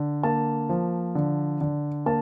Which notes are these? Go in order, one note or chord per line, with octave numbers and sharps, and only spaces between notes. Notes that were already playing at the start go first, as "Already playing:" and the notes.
Already playing: D3
A#3 A5
F3
D3
D3
A#3 A5